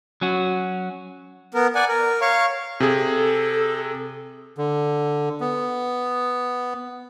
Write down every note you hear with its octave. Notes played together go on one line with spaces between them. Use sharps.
F#3 C#4 F#4
B3 A#4
D5 F#5 G#5
A#4
C#5 F5 C#6
C3 G#4 A4
D3
B3